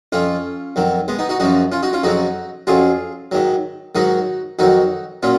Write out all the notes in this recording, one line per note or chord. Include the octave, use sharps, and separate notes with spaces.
F2 F3 C#4 F4
F2 D#3 F#3
G#3 B3
B3 D#4
D#4 F#4
F#2 C#3 F3 D#4 F#4
C#4 F4
D#4 F#4
C#4 F4
F2 C#3 F#3 D#4 F#4
F2 C#3 F#3 F4 G#4
G#2 D#3 F#3
G#2 D#3 F#3 D#4 F#4
F2 D#3 F#3 D#4 F#4
A#2 F#3 C#4 F4